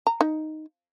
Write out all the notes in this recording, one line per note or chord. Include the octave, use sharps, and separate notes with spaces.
A#5
D#4